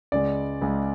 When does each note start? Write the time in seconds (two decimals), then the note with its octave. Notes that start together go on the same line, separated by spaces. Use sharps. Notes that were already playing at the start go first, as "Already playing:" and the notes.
0.12 C#2 C#3 G#3 D5
0.62 C#2 C#3 G#3